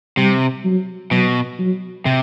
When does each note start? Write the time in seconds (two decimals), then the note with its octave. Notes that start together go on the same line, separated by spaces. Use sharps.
0.17 C3 G3
0.64 F#3
1.11 B2 F#3
1.59 F#3
2.06 C3